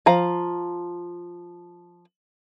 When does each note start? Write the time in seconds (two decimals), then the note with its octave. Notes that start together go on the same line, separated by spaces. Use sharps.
0.06 F3 F5 A#5